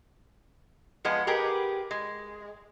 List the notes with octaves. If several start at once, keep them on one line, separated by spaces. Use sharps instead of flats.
F3 G#3 B3 D#5
G4 G#4 A#4 B4
G#3